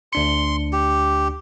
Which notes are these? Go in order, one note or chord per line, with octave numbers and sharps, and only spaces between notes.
D2 D4 C6 C#7
G4